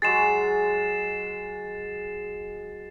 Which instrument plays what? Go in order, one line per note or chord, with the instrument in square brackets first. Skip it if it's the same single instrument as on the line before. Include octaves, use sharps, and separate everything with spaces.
[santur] F#3 G#3 G#4 [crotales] A6 C7 E7